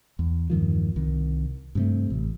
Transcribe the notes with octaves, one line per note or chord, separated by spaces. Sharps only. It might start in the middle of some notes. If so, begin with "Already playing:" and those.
E2
E2 G2 D#3 F3
C2 D#3
G2 C3 A3
A1